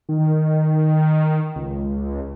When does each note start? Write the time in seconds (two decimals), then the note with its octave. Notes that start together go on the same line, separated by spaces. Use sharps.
0.09 D#3
1.56 C#2